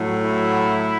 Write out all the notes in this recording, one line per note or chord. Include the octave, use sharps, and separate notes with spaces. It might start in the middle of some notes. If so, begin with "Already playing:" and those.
Already playing: A2 F#3
E4